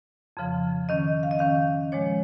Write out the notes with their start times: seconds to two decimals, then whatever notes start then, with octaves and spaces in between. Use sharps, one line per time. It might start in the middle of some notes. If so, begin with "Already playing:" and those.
0.37 F2 C#3 F3
0.89 D#3 C#4 D#5
1.23 F5
1.31 D#5
1.39 D#3 C#4 F5
1.92 A#2 F3 G#3 C#5